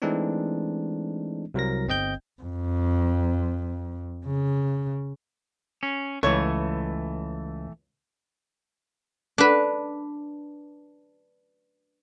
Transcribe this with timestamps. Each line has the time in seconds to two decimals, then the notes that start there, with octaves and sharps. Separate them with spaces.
0.02 E3 G#3 A3 C4 D4 D#4
1.54 C2 F#3 A#4 A#6
1.88 G1 C4 D#5 G5 G6
2.42 F2
4.26 C#3
5.83 C#4
6.23 C#2 E3 A3 C#5
9.38 D4 B4